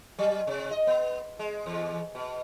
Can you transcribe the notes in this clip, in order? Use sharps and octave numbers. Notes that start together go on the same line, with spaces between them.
F#3
C3
D#5
B3
G#3
E2
B2